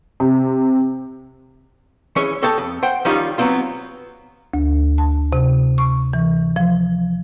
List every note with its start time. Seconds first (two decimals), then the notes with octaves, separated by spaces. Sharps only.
0.20 C3
2.16 E3 C#4 G#4 C#5 D#5
2.43 A4 C#5 D#5 G5 A5
2.58 F2
2.83 C5 F#5 G5
3.05 D#3 F3 G3 C#4 D#4 F4
3.38 F#3 B3 C4 F4
4.54 D2
4.98 A5
5.33 C3
5.78 C#6
6.13 E3
6.56 F3